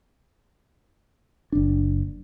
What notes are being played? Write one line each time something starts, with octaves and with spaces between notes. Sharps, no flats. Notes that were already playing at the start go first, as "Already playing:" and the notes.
F#1 D4